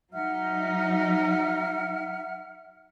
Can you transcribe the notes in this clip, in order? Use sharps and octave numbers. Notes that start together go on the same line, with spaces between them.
F#3 D#4 E5 F#5 F6